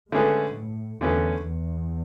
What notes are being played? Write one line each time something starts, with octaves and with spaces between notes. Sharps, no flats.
D3 G#3 A3 C#4 G#4 B4
A2
E2 D3 A3 C#4 G#4 B4
E2